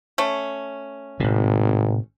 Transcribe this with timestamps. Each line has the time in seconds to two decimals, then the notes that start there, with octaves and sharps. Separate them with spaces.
0.18 A3 C#4
1.20 G#1 A2 C3